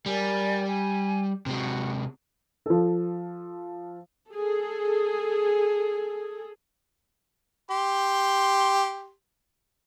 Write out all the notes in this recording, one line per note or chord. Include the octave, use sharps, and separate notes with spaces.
G3 A#4 D5 G#5
G#5
C3 G#3 F#4
F3 A4
G#4 A4
G4 C6